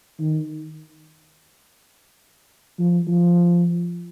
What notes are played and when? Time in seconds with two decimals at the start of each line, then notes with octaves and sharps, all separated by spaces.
0.20 D#3
2.79 F3
3.07 F3